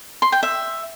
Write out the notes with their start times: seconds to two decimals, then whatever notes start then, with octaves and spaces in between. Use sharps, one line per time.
0.22 C6
0.32 G5
0.43 E5